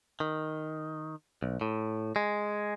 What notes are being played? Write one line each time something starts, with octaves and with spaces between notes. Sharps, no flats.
D#3
B1
A2
G#3